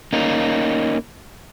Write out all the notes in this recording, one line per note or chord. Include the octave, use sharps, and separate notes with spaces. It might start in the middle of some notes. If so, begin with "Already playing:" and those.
A#3 C#4 D#4